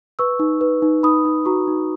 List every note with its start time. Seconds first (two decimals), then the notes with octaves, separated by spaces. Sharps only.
0.19 B4 C#6 E6
0.39 D#4
0.61 B4
0.82 D#4
1.03 D#4 B5 D#6
1.25 D#4
1.45 F#4 A#5 C#6
1.68 D#4